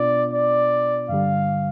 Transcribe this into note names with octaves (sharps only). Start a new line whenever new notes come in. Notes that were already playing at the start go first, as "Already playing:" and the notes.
Already playing: B2 B3 D4 F4 D5
D5
G2 D3 G3 F5